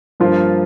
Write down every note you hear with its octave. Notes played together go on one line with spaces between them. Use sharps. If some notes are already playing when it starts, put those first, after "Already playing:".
G2 F3 A#3 F4